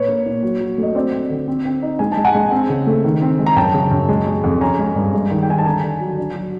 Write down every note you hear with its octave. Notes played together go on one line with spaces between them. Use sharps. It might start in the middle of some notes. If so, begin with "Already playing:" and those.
Already playing: A#2 B4 C#5
A#3
A#2
F#3
F#3
A3 D#5
C4 C5 D5
C4
D3
C4
C4
D#4
G#3 G#5
A5
G#3
F#5 G#5
G#3
C4
C#3
A3
D#3
C4
G#3
A#5
F#2 G5 A5
C#3
F#2
G#3
G#3
F2
C#4 G#5 A#5
G#3
G2
G#3
D#3
G5
D#3 G#5
A5
D3 G#5 A#5
D3
F#3
D4
F#3